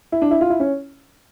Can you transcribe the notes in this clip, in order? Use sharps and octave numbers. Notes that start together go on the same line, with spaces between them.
E4
D4
E4
F4
E4
C#4